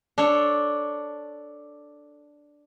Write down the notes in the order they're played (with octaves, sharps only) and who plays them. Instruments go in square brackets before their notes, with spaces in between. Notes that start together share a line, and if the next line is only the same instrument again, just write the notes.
[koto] D4 A4 C#5